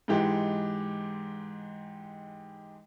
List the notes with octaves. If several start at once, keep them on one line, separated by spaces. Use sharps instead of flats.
G#2 E3 G#3 G4